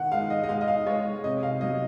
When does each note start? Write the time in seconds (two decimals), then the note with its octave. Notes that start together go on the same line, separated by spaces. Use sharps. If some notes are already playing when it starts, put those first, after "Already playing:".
Already playing: D#3 F#5
0.11 G#3 F5
0.30 D#5
0.43 D#5
0.49 G#3 F5
0.61 D#5
0.68 F5
0.86 G#3 C#5
1.24 C3 D#5
1.43 F5
1.61 F#3 D#5